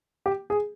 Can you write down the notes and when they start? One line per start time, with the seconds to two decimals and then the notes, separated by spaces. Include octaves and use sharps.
0.26 G4
0.50 G#4